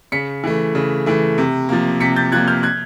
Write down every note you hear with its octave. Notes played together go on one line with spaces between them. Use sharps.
C#3 B6 C#7
E3 A3
C#3
E3 A3
C3
F3 A#3
C3 B6 C#7
G6 A6
F3 A#3 F#6 G#6
F6 G6
F#6 G#6